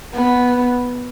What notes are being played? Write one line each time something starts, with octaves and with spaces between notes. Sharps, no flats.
B3